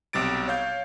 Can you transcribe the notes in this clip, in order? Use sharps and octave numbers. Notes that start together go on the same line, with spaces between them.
B1 C3 G3 A6 D7
C#5 F5 G6